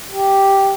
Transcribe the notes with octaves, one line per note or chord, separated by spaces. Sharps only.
G4